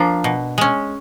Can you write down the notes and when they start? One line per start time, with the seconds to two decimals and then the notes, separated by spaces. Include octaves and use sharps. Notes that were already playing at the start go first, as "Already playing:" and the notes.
Already playing: F3 A#3 D4
0.24 B2
0.58 G#3 C#4